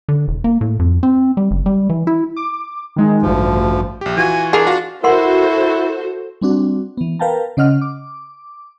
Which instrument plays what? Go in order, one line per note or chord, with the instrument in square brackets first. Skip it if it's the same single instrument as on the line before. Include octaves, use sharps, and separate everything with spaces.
[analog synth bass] D3
E1
A#3
A2
F2
C4
G3
F#1
G3
E3
E4
[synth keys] D6
D#3 G#3 D#4
[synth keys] A1 G2 [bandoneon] D2 F3
[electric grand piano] A#1 G4
[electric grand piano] E3 F4 F#4 [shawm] G#5
[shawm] D4 [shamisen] G#4 A#4
[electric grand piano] F4 F#4 F5
[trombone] E4 [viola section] F#4 A4 C5 [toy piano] A#4 F#5 C6
[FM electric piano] G3 C4 D4 F#4
E3 B3
A#4 B4 F5 G5 A5 A#5
C#3 C#4 D#5 F#5 F6
D6